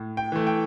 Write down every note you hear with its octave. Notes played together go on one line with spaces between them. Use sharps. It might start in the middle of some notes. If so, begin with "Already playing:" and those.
Already playing: A2
G5
E3 A3
G5